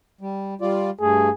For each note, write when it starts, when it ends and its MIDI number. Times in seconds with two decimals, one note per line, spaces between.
0.21 0.54 55
0.61 0.90 55
0.61 0.90 65
0.61 0.90 74
1.01 1.29 43
1.01 1.29 57
1.01 1.32 68